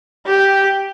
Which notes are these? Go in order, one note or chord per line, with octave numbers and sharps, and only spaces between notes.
G4